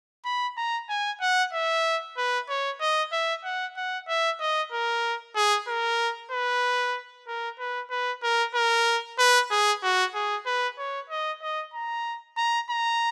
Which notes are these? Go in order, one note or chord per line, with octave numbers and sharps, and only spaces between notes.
B5
A#5
G#5
F#5
E5
B4
C#5
D#5
E5
F#5
F#5
E5
D#5
A#4
G#4
A#4
B4
A#4
B4
B4
A#4
A#4
B4
G#4
F#4
G#4
B4
C#5
D#5
D#5
A#5
A#5
A#5